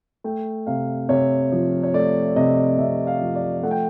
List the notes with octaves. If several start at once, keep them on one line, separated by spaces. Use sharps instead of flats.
A3 G5
C3 F5
C3 C#5
F3
C#5
A3 D5
C3 D#5
C3 E5
F5
F3
D5
A3 F#5
G5